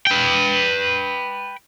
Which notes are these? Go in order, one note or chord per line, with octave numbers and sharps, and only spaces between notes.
B4 G5